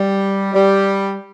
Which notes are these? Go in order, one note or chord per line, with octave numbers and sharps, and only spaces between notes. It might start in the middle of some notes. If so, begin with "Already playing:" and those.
Already playing: G3
G3